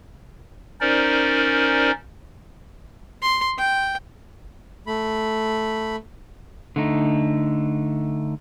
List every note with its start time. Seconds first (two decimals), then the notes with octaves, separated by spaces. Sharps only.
0.81 C#4 D#4 A#4 C5 D5
3.22 C6
3.58 G5
4.87 A3 B5
6.76 D3 A3 D#4